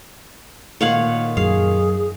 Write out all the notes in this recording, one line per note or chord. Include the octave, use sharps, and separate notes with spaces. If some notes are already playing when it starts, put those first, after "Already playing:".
A#2 D#3 C#5 F5 F#5
F#2 G#4 F5